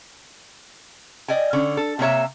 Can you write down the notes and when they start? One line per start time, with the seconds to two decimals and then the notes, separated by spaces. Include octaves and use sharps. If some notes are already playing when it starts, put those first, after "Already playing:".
1.28 D5 D#5 G5 G#5
1.53 D3 C#4
1.77 A4
1.99 C3 A#3 C#5 E5